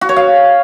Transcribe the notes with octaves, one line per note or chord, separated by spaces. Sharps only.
F#4
C#5
F5